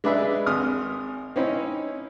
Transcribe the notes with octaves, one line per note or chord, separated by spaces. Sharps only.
G#3 D4 G#4 B4 E5
G#1 D#6 F6
C4 C#4 D#4 E4